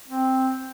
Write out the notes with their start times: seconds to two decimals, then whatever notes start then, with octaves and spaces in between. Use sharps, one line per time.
0.08 C4